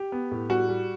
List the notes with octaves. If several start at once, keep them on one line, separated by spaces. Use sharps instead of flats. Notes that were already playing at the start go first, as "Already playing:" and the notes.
Already playing: G4
B3
A2
G3 F#4
G3